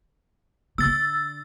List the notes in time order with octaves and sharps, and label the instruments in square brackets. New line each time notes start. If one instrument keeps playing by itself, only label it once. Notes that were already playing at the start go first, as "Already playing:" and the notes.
[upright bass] D3 [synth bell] E6 A6